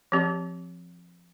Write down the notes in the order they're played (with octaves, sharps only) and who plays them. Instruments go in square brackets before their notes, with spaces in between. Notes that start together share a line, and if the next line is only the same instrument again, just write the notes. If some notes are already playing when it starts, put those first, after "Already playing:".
[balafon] F3 C4 G4